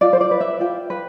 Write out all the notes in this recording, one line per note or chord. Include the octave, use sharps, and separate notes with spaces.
F4 D5
C5
D5
B4
E5
F4 G5
B4